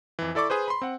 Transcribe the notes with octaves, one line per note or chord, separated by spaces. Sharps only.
F2 E3
E4 A4 D5 C#6 D6
G#4 B4 C5
B5 C6
C4 F#5